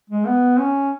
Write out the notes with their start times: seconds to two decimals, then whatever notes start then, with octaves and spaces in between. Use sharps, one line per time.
0.10 G#3
0.26 B3
0.59 C#4